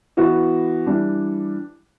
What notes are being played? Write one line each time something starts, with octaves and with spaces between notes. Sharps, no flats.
E3 B3 F#4
E3 G3 D4